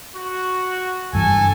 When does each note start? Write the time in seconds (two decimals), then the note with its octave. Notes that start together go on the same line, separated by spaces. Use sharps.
0.16 F#4
1.13 F#1 G2 E3 A4 G#5